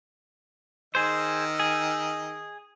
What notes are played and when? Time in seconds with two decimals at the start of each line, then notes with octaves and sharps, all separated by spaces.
0.95 D#3 G#4 C5 D#5 E6
1.59 G#4